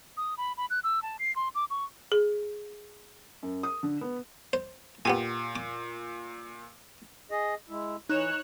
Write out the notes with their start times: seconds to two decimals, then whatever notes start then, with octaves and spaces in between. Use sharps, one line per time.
0.17 D#6
0.38 B5
0.57 B5
0.70 F#6
0.84 E6
1.02 A5
1.19 C7
1.36 C6
1.55 D6
1.70 C#6
2.12 G#4
3.43 F#2
3.63 D#6
3.83 D3
4.01 B3
4.53 C5
5.05 A#2 B3 G4 G#5
5.56 D6
7.31 G#4 D#5
7.69 G#3 E4
8.09 E3 D#4 C#5 F#6 E7